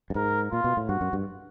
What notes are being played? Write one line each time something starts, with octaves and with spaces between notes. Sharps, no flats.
G2
G#2 A#4
A#2 F4
B2
A2
G2 F#4
F#2
G2